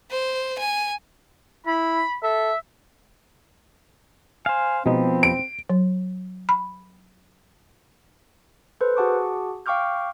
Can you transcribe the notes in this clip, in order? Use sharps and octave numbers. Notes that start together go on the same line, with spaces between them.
C5
G#5
E4 B5
A4 E5
C5 F5 G#5
B2 F3 G#3 B3 C4 D#4
D7
F#3
B5
A4 B4 C5
F#4 G#4 F#5 A5 C#6 D6
F5 G5 C#6 D6 F6 G6